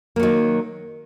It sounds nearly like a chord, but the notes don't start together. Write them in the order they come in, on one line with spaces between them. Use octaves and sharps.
A#3 F#3 D#3